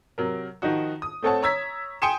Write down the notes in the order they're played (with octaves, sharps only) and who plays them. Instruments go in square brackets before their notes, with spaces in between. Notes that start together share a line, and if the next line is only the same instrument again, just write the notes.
[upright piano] C3 F#3 A#4
D#3 F3 D#4 F#4
D#6
A3 C4 A4 C#5 F#5 A5
C#5 A#5 E6 G#6 B6
G5 G#5 C6 D#6 C#7 E7